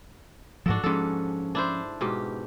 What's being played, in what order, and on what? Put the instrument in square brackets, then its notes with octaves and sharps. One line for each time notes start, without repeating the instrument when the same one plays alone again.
[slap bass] G#2 F3 [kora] D4 F#4 A4
[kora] G#2 A4 [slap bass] F3 C#4
[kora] D4 E4 C5
G#2 B2 G4